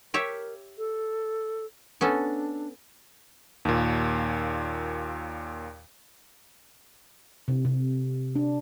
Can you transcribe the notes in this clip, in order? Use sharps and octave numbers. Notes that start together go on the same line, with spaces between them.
G4 A#4 C#5 E5
A4
B3 C#4 D4 A4
D#2 A#2
C3
C3
D4